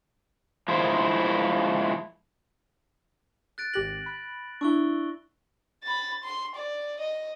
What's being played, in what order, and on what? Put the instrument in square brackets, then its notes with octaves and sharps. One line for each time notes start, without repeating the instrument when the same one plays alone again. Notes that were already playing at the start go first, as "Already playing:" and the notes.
[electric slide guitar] F3 G#3 E4 C5
[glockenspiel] F#6 A6 D7
[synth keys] G#1 G4 F#6 [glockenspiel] A#6 F#7
[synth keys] B5 F#6
[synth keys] D4 E4 [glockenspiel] C#6 E6 G7
[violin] B5 A6
C6
D5
D#5